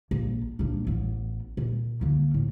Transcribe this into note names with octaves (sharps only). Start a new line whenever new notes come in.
A#1
A#1 D4
A1 B3
A#2
D3 A#3
A2